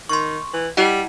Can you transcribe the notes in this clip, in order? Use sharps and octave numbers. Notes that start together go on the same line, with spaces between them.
D#3 C6 C#6
E3
G3 E4 D#5 F#5